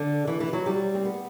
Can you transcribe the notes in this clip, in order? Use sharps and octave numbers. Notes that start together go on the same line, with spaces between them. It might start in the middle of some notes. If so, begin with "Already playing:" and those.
Already playing: D3
E3
E3
F#3
G3
C4
B3